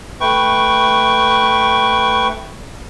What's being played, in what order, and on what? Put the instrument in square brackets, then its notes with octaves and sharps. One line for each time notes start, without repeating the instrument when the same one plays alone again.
[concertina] A3 B4 G5 C#6